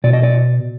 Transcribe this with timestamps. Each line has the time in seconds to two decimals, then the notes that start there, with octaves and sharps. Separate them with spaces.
0.04 B2 D5
0.13 D#5
0.23 D5